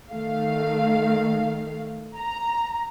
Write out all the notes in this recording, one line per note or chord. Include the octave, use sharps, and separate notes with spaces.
D#3 A3 F5
A#5